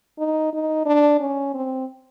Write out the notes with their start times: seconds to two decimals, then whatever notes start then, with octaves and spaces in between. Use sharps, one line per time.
0.19 D#4
0.53 D#4
0.86 D4
1.20 C#4
1.54 C4